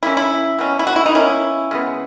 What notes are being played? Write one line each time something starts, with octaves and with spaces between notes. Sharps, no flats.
C#3 E3 A#3 C#4 E4
E4
B2 F#3 C#4
E4
F#4
E4
D#4
B2 A#3 C#4 E4
C#3 G#3 B3